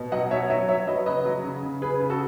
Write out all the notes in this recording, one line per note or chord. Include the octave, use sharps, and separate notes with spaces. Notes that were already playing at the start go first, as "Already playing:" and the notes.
Already playing: B2
F#3 D#5 F#5
F#3 C#5 E5
F#3 C#5 E5
F#3 C#5 E5
F#3 B4 D#5
C#3 B4 D#5
F#3
C#3
C#3
C#3 G#4 B4
C#3
F#4 A4